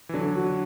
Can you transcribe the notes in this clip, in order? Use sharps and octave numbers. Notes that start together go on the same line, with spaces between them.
E3
D3 F#3 D4
F#4